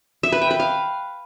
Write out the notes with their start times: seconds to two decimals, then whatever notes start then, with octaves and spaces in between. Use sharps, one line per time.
0.23 E5
0.32 B4
0.42 G5
0.51 B4
0.60 F5